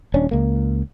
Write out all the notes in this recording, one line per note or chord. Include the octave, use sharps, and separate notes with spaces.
D#1 C#4 D4
C#2 A#3